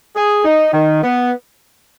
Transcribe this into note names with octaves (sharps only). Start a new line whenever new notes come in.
G#4
D#4
D#3
B3